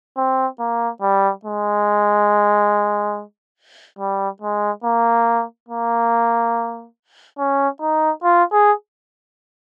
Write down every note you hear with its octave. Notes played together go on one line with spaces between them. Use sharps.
C4
A#3
G3
G#3
G3
G#3
A#3
A#3
C#4
D#4
F4
G#4